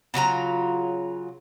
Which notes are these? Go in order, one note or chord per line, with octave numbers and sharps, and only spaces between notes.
C#3 F#3 F4 A#5